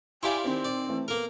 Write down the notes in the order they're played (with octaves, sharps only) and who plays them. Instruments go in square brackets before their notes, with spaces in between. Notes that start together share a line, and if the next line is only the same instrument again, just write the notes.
[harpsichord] E4 G4 D5 [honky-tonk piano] F5 C6 [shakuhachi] G#5
[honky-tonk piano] D#3 C5 [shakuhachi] C4
[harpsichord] D5
[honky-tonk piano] E3 A3
[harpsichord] A#3 A#4 [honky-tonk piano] B3 A4